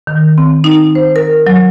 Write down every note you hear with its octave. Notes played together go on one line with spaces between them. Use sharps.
D#3
C4
D#4
C5
A#4
F#3